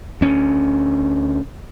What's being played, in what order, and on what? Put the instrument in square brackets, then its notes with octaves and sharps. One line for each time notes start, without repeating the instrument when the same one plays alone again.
[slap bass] D2 C#4